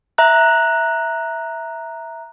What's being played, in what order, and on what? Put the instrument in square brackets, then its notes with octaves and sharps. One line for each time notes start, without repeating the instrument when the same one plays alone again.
[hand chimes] E5 A#5 F#6